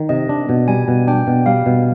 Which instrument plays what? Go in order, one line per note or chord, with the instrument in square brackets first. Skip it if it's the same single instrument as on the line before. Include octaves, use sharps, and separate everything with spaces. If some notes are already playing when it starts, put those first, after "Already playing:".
Already playing: [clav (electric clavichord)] D#3
[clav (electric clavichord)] C3 [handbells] D#5
[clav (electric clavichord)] D4
B2
[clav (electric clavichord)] G3 [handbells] G#5
[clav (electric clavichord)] B2
[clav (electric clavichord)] D4 [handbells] G5
[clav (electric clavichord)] B2
[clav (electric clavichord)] G3 [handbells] F5
[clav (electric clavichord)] B2